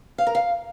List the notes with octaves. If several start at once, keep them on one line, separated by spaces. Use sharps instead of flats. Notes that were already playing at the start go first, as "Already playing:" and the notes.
F5
A#4
F5